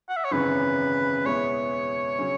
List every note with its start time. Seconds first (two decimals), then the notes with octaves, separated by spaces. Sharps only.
0.09 F#5
0.16 E5
0.24 C#5
0.32 G#1 F#2 C#3 E3 B4
1.25 E2 B2 G#3 B3 E4 C#5
2.19 C#3 F#3 C#4